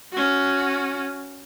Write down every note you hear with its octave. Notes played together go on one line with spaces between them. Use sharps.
C#4 F#4